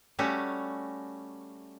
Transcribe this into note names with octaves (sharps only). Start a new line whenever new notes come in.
G3 A3 C#4 F#4